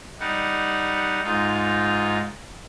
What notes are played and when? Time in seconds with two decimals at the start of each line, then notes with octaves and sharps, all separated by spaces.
0.20 G3 D#4 F#5
1.24 G#2 D#4 F4